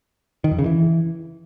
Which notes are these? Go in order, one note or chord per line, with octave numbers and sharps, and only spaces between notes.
D#3
F2
C#3
E3